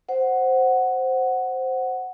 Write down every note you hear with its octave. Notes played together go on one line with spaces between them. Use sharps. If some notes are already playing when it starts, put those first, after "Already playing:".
C5 F#5